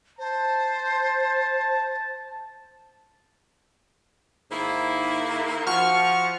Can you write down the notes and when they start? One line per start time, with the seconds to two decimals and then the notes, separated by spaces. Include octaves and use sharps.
0.19 C5 A5
4.51 G#2 D#3 A#3 E4
5.67 F3 F#4 C#6 F6